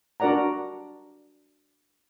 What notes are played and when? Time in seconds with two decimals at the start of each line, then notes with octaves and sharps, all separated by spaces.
0.20 D4 F#4 A#4 D5 F#5 A#5